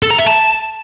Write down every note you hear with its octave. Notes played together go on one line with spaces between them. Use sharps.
A4
A#5
E5
A5